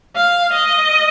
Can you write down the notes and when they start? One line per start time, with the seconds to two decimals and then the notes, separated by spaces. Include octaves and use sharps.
0.16 F5
0.53 D#5